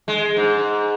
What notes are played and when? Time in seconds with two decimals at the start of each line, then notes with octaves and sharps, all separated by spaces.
0.08 G#3
0.37 G#2